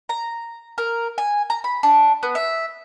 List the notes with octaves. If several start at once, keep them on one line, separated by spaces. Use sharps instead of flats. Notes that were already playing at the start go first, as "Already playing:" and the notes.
A#5
A#4
G#5
A#5
B5
D4
B3
E5